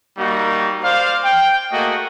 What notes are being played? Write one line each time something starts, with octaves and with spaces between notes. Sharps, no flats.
G3 A#3 D#4 F#4
C5 D5 F5
G5
A3 A#3 F#4 G#4 D#5